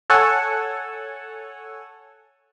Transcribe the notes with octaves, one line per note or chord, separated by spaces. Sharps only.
A4 C#5 F#5 G#5 E6